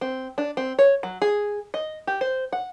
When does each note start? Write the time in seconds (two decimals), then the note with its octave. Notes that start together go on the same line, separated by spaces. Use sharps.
0.01 C4
0.38 D4
0.57 C4
0.79 C#5
1.03 F#3
1.22 G#4
1.74 D#5
2.07 G4
2.21 C5
2.53 F#5